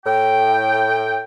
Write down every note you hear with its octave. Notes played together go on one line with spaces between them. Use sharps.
A2 G5